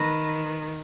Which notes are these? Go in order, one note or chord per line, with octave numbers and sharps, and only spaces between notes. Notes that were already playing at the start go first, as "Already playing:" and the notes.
Already playing: D#3 B4